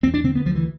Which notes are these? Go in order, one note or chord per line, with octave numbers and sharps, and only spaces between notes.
E2 C4
D4
D3 C4
B3
D2 F3
E3